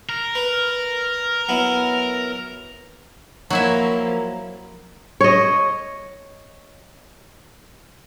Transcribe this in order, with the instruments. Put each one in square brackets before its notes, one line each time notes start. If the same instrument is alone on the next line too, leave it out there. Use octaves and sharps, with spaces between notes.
[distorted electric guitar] A#4
[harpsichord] B4
F#3 B3 E4
[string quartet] F3 A#3 [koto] F#3 E4 E5
[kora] C#5 D#5